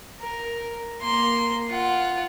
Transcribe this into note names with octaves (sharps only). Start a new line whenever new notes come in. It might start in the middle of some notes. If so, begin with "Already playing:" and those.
A#4
A#3 C6
F4 F#5